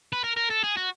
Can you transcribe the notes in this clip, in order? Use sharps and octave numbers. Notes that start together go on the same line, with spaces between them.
B4
A#4
A#4
A4
G#4
F#4